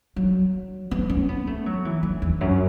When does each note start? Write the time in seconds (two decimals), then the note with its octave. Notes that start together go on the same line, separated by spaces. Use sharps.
0.16 F#3
0.91 B3
1.10 C#4
1.29 B3
1.47 A3
1.66 F#3
1.85 E3
2.03 E3
2.22 E2
2.41 F#2